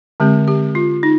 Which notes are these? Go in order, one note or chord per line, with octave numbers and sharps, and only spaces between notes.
D3 G#3 C4 G4
G4
F4
D#4